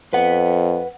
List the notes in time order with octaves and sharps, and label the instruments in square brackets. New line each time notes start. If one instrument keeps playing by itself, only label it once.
[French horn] F2 [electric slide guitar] B4 F#5